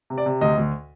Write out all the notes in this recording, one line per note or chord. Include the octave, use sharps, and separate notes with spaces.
C3
D5
C3
D2 D#5
D2